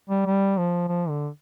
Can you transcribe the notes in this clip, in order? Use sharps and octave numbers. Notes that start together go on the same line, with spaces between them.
G3
G3
F3
F3
D3